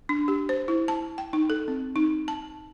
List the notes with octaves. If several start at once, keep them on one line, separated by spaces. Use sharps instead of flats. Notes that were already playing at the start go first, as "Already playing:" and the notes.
D4
G4
C5
E4
A5
G5
D#4
A4
C4
D#4
A5